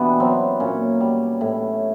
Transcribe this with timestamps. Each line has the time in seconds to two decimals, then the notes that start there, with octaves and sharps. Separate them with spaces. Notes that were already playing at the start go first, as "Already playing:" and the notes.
Already playing: B2 E3 G3 B3 D4
0.20 F#3 C4
0.60 A#2 C#4
1.00 G3
1.41 A2